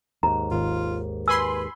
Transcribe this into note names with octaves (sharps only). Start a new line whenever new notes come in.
D#2 G#2 A#5
G#1 F4
B4 G#5 B5 C6 E6